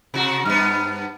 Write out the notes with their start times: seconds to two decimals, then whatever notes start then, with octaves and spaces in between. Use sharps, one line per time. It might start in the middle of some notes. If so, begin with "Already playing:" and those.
0.14 C3 F#4
0.45 G2 B3 F6